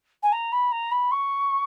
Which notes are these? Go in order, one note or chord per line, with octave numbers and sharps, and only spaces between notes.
G#5
A#5
B5
A#5
B5
C#6